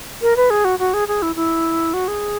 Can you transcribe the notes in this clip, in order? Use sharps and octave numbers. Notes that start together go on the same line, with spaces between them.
A#4
B4
G#4
F#4
F#4
G#4
G#4
E4
E4
F#4
G#4